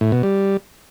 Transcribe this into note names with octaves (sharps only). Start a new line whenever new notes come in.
A2
B2
G3